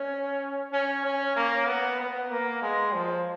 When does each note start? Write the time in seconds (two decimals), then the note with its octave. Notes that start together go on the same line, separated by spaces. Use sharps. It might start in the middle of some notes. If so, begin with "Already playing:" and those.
Already playing: C#4
0.72 C#4
1.05 C#4
1.36 A#3
1.67 B3
2.00 B3
2.30 A#3
2.62 G#3
2.94 F3